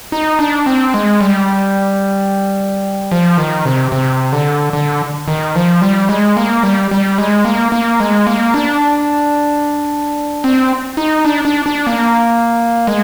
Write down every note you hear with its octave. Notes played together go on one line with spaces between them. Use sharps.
D#4
D4
C4
G#3
G3
F3
D#3
C3
C3
D3
D3
D#3
F3
G3
G#3
A#3
G3
G3
G#3
A#3
A#3
G#3
A#3
D4
C4
D#4
D4
D4
D4
A#3
G#3